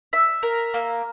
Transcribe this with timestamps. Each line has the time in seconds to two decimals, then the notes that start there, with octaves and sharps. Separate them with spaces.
0.13 E5
0.43 A#4
0.74 A#3